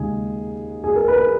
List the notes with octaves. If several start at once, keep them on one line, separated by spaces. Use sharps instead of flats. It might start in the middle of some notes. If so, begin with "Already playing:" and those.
Already playing: D#2 C#3 G#3 G#4
G#4
A#4
B4
A#4